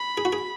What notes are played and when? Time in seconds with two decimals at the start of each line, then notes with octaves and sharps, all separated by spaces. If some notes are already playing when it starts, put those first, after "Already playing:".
Already playing: B5
0.18 G#4
0.25 F#4
0.33 G#4